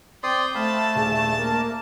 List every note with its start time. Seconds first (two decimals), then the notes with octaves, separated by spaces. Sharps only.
0.23 C4 D5 G5 C6 D#6
0.55 A3 C5 F5 A5 B5
0.95 D#1 D4 G#4 E7
1.37 A#3